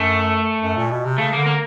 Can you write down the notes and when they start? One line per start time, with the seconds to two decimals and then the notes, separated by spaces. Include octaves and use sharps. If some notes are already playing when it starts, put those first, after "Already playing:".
Already playing: F#2 A3
0.62 F#2
0.76 A#2
0.91 B2
1.05 C3
1.18 C#3 A3
1.33 A#3
1.38 D3
1.46 A#3